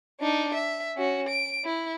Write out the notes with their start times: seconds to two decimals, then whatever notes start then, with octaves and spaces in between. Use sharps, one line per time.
0.20 D4 D#4
0.55 E5
0.97 C#4 F#4
1.29 D7
1.65 E4